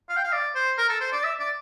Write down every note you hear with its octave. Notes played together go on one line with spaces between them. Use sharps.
F5
G5
F5
D5
C5
A#4
A4
C5
D5
E5
D5